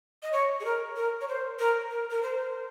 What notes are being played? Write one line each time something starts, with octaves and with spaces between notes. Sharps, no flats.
D#5
C#5
G#4
A#4
A#4
C#5
C5
A#4
A#4
A#4
C5